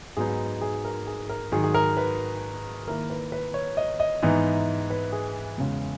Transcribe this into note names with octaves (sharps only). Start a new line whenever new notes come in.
G#2 F#3 B3 D#4 G#4
G#4
A#4
G#4
A#4
G#2 D#3 F#3 G#4
G#4
A#4
B4
D#3 A#3 E4 A#4
B4
B4
C#5
D#5
D#5
G#2 E3 B3 D#4
B4
G#4
E2 C#3 G#3